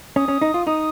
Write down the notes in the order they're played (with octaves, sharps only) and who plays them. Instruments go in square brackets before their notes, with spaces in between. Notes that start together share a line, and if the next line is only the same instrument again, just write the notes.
[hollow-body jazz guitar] C#4 [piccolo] D#6
[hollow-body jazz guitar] C#4
D#4
F4
[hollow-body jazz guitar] D#4 [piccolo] D#6